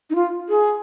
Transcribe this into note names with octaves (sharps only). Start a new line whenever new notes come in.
D#4
F4
G#4